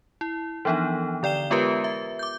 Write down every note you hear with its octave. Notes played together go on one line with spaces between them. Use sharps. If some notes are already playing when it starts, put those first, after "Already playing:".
E4
E3 F3 B3 D4 D#4
D3 D5 G5 E7 G7
G#3 B3 F4 G4 A#4 B4
E5
D6 G6